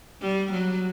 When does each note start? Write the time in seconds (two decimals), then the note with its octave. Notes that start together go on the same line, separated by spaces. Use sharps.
0.22 G3
0.52 F#3